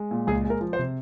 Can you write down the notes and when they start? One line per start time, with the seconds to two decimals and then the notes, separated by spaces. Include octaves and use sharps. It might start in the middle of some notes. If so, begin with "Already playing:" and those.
Already playing: G#3
0.11 A#2
0.27 C#2 G#4
0.45 G#3
0.50 A#4
0.61 F3
0.73 C5
0.79 C3